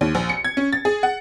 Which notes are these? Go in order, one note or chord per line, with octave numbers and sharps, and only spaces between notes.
D#2
A#1
C#7
G#6
C#4
A6
G#4
F#5